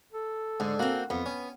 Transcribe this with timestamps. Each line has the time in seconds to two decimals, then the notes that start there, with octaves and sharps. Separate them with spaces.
0.12 A4
0.60 G#2 D3
0.79 A#3 C4 F#4
1.10 F2 B3
1.26 C#4